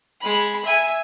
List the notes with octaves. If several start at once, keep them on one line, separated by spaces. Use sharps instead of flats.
G#3 B5
E5 G#5